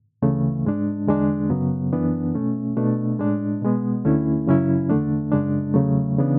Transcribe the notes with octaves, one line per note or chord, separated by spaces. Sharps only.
D2 C#3 E3 A3
G#2 G#3 D4
E2 D3 G#3 D4
F#2 C#3 F#3 B3
F#2 E3 B3 D4
B2 A3 C#4
B2 A3 D4
A2 G#3 D4
B2 G#3 B3
D2 D3 A3 C#4 E4
F#2 C#3 F#3 C#4 E4
E2 D3 A3 D4
F#2 C#3 G#3 D4
E2 C#3 F#3 A3
C#3 E3 B3 D4